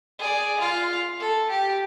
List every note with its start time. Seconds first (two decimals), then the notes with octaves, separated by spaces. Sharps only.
0.19 G#4 D5
0.59 F4 F5
1.20 A4
1.50 G4